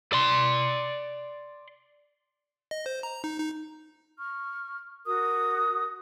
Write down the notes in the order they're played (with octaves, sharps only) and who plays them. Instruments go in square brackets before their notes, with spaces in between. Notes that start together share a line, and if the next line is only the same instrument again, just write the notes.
[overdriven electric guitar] D5 C6
[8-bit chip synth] D#5
C5
A#5
D#4
D#4
[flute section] C#6 F6
F#4 A#4 D#6